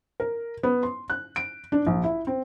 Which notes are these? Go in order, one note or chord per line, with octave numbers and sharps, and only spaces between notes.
A#4
B3
C6
F#6
D7
D4
A#1
E4
C4